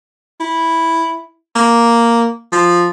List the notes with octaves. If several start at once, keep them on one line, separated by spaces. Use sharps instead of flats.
E4
A#3
F3